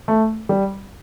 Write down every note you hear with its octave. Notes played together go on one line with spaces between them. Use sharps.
A3
G3